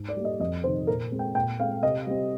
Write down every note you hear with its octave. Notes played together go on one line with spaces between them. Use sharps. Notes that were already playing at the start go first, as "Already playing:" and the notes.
Already playing: G#2
D5
G3 A#3
D#5
F2 D#5
C3 D#3 C5
A#2 A#4
G#3 C4
G5
A#2 G5
G#3 C4 F5
C3 D#5
G3 C4